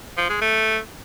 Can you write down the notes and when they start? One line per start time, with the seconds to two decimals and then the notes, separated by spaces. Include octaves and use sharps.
0.17 F3
0.29 G#3
0.41 A3